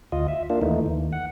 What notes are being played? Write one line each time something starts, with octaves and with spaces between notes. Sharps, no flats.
D2 F4 D#5
E5
A#3 D4 F4
D#2 E3 A3 D#4
D#2
F#5